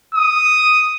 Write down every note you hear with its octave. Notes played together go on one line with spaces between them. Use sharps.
D#6